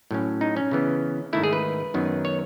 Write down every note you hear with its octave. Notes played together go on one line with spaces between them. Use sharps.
A2 F#3 C#4
D#4
C#4
C#3 E3 B3
G#2 D#3 A3 E4
G#4
B4
F#2 D#3 F#3 B3
C#5